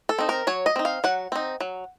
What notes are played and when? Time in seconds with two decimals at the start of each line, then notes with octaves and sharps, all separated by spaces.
0.09 A4
0.19 C4 D#4
0.29 A#4
0.47 F#3 C#5
0.66 D#5
0.76 C4 D#4
0.85 F5
1.04 F#3 F#5
1.32 C4 D#4
1.61 F#3